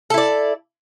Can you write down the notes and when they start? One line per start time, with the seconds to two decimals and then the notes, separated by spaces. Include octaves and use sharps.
0.10 A4
0.14 E4
0.18 D5